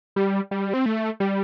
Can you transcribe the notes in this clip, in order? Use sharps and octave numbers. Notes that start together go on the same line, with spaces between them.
G3
G3
C4
A3
G3